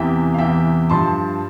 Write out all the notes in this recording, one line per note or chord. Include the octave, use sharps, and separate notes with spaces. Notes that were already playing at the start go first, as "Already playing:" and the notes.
Already playing: E2 C3 E3 E5 G5
F5
E2 C3 E3 E5 G5
G2 F3 A5 C6